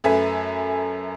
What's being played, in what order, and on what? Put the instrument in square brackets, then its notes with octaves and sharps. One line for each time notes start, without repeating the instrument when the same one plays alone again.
[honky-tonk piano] F#2 A3 A4 B4 E5 G#5